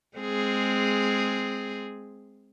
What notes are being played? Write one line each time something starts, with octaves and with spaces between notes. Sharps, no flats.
G#3 C4 G#4